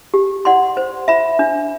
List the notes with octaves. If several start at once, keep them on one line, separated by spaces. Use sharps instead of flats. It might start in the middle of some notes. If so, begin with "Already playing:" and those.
G4
D5 F#5 C6
C5
E5 B5
D4